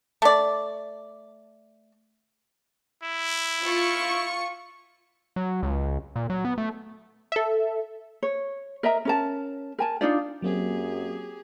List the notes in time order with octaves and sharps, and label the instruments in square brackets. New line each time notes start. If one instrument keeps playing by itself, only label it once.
[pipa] A3 D5
[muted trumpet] E4
[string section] F4 C#6
[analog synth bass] F#3
C#2
A#2
F#3
B3
A3
[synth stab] A4 E5
[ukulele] C#5
A#4 D#5 E5 A#5
C#4 A#4 A5
A#4 G#5 A5
D4 D#4 F4 D5
[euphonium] F#2 [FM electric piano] F#3 A#3 C4 [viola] G4 G#4